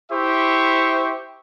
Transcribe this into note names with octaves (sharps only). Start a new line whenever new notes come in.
E4 G4 C5 E5 C#6